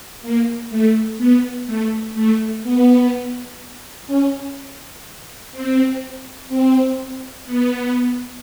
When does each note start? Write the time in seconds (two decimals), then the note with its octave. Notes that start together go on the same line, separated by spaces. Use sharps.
0.22 A#3
0.70 A3
1.18 B3
1.66 A3
2.14 A3
2.63 B3
4.07 C#4
5.52 C4
6.49 C4
7.46 B3